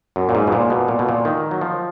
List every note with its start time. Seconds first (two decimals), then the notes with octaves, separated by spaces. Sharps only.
0.16 F#2
0.29 A#2
0.35 G#2
0.47 B2
0.52 A#2
0.70 B2
0.88 A#2
0.99 B2
1.09 A#2
1.25 D#3
1.51 F#3
1.61 F3